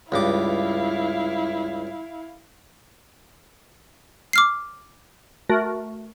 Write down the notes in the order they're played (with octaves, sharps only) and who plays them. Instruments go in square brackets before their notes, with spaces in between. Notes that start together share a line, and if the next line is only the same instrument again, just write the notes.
[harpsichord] C#2 G2 D6 [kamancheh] E4 F5
[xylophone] D6 F6 C7
[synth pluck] A3 F#4 A#4